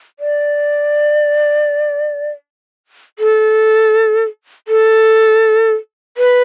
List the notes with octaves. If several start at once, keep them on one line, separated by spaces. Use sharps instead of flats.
D5
A4
A4
B4